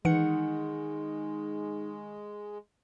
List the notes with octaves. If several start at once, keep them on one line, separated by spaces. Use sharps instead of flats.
D#3 E3 G#3 D#4 F#5 C#7